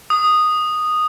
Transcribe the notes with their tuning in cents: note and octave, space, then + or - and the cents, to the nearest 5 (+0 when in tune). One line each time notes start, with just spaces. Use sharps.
D#6 -10